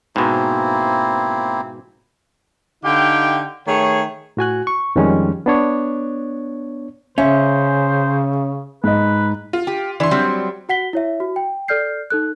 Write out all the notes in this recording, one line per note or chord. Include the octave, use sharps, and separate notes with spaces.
G#2 B2 A#3 C4 E4
D3 D#4 G4 F5 G5
D#3 A3 G#4 C#5
A2 F#4 G#5 F#6
C#6
F2 D#3 F3 G3 G#3 C#4
B3 D4 C#5
C#3 C#4 C5 E5
G#2 B4 D#5
F4
G4
E3 D4 C6
F#3 G3 C4
F#4 F#5 B6 G7
E4 C#5 E5
F#4
G5
A4 D5 F6 G6 C7
D#4 A4 F#6